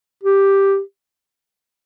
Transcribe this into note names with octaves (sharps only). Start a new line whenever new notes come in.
G4